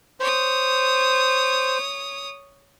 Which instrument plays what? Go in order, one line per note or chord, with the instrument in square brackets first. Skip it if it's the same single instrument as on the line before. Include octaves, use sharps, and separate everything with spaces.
[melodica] C5 [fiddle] C#5 D#6